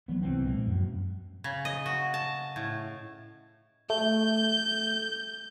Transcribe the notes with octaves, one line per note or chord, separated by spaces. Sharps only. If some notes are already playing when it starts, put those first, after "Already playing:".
E3 F#3 G3 B3
C2 E3 C4 D4
A#2 F3 G#3 A#3
F#2
C#3
D#5
F#4
A5
A2
A3 G6